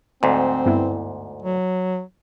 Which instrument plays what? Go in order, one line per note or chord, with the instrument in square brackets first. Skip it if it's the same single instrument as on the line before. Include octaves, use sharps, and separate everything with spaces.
[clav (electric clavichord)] D2 G#2 [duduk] C4
[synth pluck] G2 B3 E4
[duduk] F#3